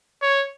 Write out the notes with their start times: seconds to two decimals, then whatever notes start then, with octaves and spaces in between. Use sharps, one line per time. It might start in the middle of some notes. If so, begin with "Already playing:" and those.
0.22 C#5